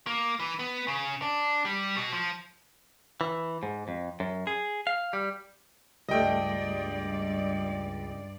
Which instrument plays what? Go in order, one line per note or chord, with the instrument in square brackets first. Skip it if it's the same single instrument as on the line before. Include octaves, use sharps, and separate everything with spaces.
[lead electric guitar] A#3
E3
B3
C#3
D4
G3
B2
F3
[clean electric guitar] E3
G#2
F2
F#2
G#4
F5
G3
[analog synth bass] C#2 [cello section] G2 D5 [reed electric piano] G3 A3 [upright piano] D#5 G5